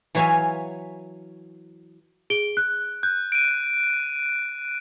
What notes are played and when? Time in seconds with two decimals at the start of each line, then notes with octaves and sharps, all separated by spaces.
0.15 E3 F#3 C#5 E5 F5 G#5
2.30 G#4 D7 G7
2.57 F#6
3.03 F#6 G6
3.32 D7 D#7